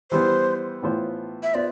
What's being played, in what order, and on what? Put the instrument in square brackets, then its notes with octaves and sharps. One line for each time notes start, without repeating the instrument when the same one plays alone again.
[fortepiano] E3 G3 B3 [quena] C5
[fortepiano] A2 E3 B3 F4 C5
[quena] E5
[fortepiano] B3 F4 C5 [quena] D5